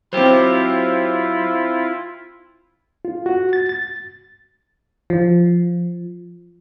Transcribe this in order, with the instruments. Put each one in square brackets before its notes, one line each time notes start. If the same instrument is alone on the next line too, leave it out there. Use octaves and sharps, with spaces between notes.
[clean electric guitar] F#3 G4 [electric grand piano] C4 C5 [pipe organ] E4 F4
[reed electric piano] F4
F#4
A6
A6
[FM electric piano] F3